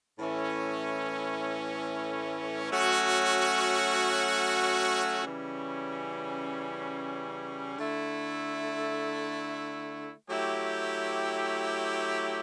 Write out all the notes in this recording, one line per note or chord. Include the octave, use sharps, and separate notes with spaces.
A2 E3 A3 C#4
F#3 A3 C#4 F#4
C#3 E3 G3 C#4
D3 A3 E4
F#3 A3 E4 G4